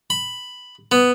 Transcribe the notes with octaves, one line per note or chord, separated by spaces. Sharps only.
B5
B3